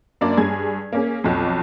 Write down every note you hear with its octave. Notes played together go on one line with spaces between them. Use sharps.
F#2 A#3 D4 D5
G2 G#4 G#6
A#3 C#4 G#4
B1 F2